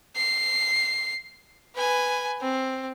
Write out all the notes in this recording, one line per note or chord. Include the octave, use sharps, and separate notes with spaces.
C7
B4 G#5
C4